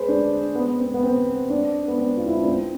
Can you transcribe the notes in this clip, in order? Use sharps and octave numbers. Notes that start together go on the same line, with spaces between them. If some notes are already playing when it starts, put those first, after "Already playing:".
Already playing: G#4 B4 C5
D4
B3
C4
B3
C4
D4
B3
C4
F4
E4
D4
C4